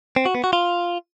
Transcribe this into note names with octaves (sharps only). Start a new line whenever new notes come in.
C4
F#4
B3
F#4
F4